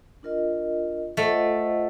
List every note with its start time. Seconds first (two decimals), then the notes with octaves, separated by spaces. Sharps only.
0.23 D4 F4 A#4 D#5
1.17 A3 F4 A4 C5 D#5 F#5